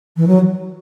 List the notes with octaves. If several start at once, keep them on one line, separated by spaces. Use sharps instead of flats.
E3
F#3